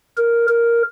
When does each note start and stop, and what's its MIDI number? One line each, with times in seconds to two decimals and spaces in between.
0.17 0.46 70
0.48 0.82 70